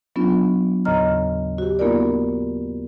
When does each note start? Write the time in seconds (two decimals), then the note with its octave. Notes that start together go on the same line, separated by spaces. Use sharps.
0.16 F#3 B3 C#4 D4 F4
0.85 D#2 A2 C#3 D#5 A#5 F6
1.58 F#4 G4
1.79 A#3 B3 D#4 F4 A#4 D5